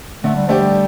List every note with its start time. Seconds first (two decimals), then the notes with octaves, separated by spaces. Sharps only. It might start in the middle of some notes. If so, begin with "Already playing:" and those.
0.24 D3 A3
0.36 G3
0.47 F3 A3 D4 G4
0.59 G3